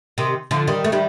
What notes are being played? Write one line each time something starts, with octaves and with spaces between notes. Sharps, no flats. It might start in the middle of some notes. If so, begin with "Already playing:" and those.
C3 D#3
D3 F3
D#3 G3
A3
D#3 G3